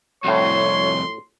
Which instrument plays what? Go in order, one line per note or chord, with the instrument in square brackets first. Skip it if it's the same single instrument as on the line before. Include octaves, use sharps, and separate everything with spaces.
[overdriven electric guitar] C2 F2 [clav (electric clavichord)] A2 F#4 [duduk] C#5 [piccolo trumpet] C6